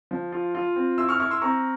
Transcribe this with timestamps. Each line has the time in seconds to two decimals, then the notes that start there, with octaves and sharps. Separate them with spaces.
0.11 F3
0.32 F4
0.55 F4
0.76 C4
0.98 E4 C6 E6
1.09 C#6 F6
1.20 E4 C#6 F6
1.31 C6 E6
1.42 C4 A#5 C#6